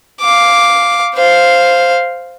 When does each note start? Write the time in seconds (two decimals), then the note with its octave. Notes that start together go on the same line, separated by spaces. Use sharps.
0.20 F5 D6
1.15 C5 F5